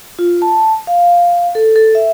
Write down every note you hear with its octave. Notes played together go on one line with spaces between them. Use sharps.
F4
A5
F5
A4
A4
E5